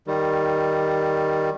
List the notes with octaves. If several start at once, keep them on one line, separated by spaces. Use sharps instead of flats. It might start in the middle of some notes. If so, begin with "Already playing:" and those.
D#3 G3